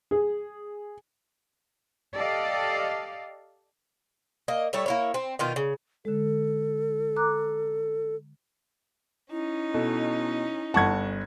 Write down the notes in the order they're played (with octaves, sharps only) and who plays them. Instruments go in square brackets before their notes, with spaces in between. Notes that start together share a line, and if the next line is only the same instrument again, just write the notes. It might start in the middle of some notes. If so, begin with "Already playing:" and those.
[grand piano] G#4
[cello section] G4 A4 D5 D#5 F5
[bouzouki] A#3 D#5
G3 A3 C#5 E5
A#3 E4 C#5
C4
B2 D#3 F4
C#3
[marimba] D3 G#3 [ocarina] A4
[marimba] A#5 D6 F#6
[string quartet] C#4 D#4 [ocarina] E4
[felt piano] B2 [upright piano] A4
[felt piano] G1 F#5 [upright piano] A5 C#6 G#6